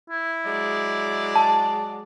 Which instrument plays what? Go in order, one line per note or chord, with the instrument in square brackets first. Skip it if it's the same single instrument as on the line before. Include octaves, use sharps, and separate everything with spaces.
[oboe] E4
[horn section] F#3 G#3 D5
[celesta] A5